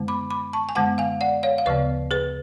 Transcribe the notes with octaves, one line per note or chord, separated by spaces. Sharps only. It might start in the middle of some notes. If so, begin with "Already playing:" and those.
Already playing: F#2 D3 G#3 B3
B5 D6
B5 D6
A5 C#6
G#5
F#2 D3 G#3 B3 F#5 A5
F5 G#5
D5 F#5
C#5 F5
F5
D2 C#3 F3 B3 B4 D5
G#4 B4